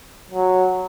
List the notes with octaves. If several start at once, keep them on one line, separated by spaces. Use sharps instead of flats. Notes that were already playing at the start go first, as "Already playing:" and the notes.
F#3